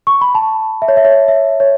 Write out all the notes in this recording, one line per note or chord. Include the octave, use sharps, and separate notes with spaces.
C#6
B5
A5
E5
C#5
E5
C#5
E5
C#5